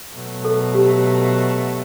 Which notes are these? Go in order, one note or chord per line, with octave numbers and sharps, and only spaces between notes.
B2 F#3 A3
A4
G4